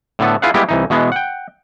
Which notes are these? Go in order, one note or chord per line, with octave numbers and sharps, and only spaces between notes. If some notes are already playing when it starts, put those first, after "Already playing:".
A2 D3 B3 A4
E4 F4 G#4 B4 F5 F#5
G3 G#3 A#3 B3 E4 G4
C2 E3 D#4
B2 E3 G#3 B3
F#5 G5